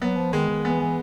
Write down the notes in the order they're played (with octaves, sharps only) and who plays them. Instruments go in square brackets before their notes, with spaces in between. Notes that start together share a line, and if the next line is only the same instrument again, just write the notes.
[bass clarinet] F#3 [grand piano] B3
[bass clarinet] F3
[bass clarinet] D#3 [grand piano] G#3
[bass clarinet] D#3
[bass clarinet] E3 [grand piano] B3
[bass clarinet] E3